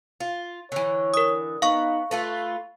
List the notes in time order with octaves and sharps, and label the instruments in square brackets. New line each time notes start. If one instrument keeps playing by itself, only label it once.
[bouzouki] F4
[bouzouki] D3 E3 [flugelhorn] C#5
[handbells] A#4 D#6
[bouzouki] B3 [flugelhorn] D#4 [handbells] F5 C#6
[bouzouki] A3 F4 B4 [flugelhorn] A4